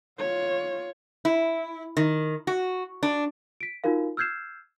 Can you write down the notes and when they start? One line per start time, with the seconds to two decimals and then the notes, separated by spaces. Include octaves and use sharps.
0.19 F4 C#5
1.25 E4
1.97 D#3
2.47 F#4
3.03 D4
3.61 B6 D7
3.84 D#4 F4 F#4 A#4 F5
4.17 E6 F6 G6 G#6 C7 E7